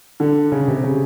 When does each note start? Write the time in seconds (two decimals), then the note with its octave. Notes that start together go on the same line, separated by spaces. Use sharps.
0.20 D3
0.52 C#3
0.68 C3
0.83 C#3